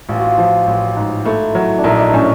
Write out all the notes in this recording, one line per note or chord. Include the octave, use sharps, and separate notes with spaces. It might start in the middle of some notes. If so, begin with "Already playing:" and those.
A1 F4
F#4
F4
F3
A1
G#2
A3 E4
F#3
D4
A#1 D#4
D4
A2 C#4